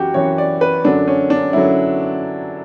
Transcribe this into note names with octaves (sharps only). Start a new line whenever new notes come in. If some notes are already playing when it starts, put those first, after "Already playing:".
Already playing: F#2 E3 F#4 G4
F#2 E3 C#5
D5
B4
F#2 D3 F#3 D4
C#4
D4
F#2 D3 F#3 E4